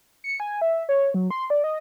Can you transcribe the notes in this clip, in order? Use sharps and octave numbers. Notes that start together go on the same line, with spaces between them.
C#7
G#5
E5
C#5
F#3
C6
D5
D#5